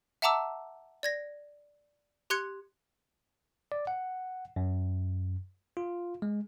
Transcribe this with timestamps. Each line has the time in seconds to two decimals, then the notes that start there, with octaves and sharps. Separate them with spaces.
0.22 E5 F#5 A5 A#5 D6 E6
1.03 D5 G#6 A#6
2.30 G4 C6 F#6 G#6 C#7
3.72 D5
3.87 F#5
4.56 F#2
5.77 F4
6.22 G#3